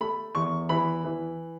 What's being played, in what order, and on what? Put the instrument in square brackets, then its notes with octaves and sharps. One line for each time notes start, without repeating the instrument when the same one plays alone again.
[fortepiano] A3 B5
E2 C#6
E3 B5
E3